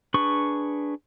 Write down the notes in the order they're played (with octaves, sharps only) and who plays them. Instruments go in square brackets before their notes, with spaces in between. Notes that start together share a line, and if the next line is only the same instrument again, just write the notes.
[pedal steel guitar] D4 G#4 B4 C#6